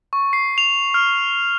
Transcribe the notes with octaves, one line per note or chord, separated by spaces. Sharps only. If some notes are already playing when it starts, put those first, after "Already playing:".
C#6
C7
F7
F6